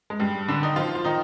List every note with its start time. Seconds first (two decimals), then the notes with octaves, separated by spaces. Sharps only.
0.10 G#3
0.20 G2 G3
0.48 D3 D4
0.62 D#3 D#4
0.76 F3 F4
0.95 F4
1.05 D#3 D#4